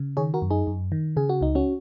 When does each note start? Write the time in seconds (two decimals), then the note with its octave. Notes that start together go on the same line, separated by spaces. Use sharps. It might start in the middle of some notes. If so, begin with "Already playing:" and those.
Already playing: C#3
0.17 D#3 G#4 C#5
0.34 F#4 A#4
0.42 F#2
0.50 D#4 G#4
0.67 F#2
0.92 D#3
1.17 C#3 G#4
1.29 F#4
1.41 C#2 D#4
1.55 C#4 F#4